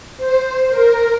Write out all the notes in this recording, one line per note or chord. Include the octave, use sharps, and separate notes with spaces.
C5
A#4